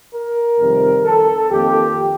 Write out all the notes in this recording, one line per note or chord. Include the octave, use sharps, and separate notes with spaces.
A#4
F2 C3 D#3 G3
A4
F2 D#3 A#3 G4